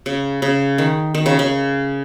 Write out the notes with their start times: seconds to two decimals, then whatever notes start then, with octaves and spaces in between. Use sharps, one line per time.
0.06 C#3
0.42 C#3
0.78 D#3
1.15 D#3
1.26 C#3
1.39 C#3